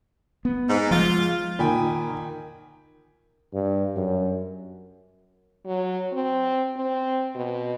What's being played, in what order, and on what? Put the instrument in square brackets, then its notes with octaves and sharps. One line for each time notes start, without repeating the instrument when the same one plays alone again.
[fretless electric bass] B3
[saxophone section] G#2
[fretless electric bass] F3 G3 G#3 [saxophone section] F4
[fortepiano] A#2 [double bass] D#3 [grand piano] G5 G#5 B5
[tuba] G2
F#2
[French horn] F#3
C4
C4
B2